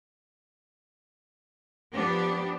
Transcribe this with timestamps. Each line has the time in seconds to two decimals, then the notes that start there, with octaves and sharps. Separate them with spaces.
1.91 F3 B3 D4 G4